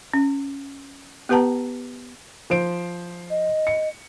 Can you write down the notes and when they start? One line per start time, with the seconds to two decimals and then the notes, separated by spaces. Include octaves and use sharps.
0.14 C#4
1.29 B3 G4 B4 F#5 A5 A#5
2.50 F3 C5 D7
3.30 D#5
3.67 C#7